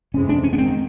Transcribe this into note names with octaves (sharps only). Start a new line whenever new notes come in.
F2 C3 E3 G#3 C#4
D4
C#4
B3
G#2 D#3 C4